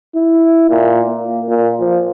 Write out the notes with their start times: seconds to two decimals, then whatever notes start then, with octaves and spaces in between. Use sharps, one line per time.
0.15 E4
0.70 A#2
1.06 A#3
1.48 A#2
1.80 F3